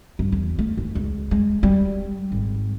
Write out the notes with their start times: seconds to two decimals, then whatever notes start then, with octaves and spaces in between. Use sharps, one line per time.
0.19 G2
0.32 E2
0.59 A3
0.77 D#2
0.95 C#2
1.31 G#3
1.63 G3
2.32 G#1